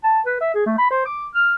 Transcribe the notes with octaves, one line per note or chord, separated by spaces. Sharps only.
A5
B4
E5
G#4
A3
B5
C5
D6
F6